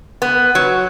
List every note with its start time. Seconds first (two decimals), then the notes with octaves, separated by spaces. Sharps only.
0.22 B3
0.55 F#3